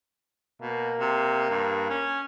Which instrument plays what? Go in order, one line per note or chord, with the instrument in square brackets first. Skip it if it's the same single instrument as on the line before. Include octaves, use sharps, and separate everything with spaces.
[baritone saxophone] B2 [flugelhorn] A#3
[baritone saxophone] C3
G2
C#4